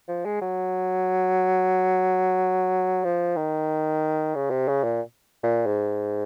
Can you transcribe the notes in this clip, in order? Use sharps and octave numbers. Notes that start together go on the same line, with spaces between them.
F3
G#3
F#3
F3
D#3
C#3
C3
C#3
A#2
A#2
G#2